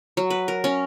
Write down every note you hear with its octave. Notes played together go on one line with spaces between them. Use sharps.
F#3
B4
A#4
C#4